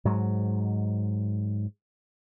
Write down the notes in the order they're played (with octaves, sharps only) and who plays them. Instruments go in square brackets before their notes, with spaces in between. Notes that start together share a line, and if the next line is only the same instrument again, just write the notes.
[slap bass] G#2 F#3